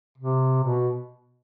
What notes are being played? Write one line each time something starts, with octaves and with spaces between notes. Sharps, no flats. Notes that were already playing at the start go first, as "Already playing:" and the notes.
C3
B2